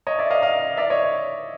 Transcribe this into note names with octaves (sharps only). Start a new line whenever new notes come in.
C#5 D#5
D5 E5
D#5 F5
D#5 F5
D5 E5
C#5 D#5